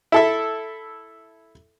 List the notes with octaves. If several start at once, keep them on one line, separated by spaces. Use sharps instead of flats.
E4 A4 E5